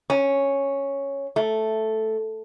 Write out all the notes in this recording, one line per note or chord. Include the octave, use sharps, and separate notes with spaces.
C#4
A3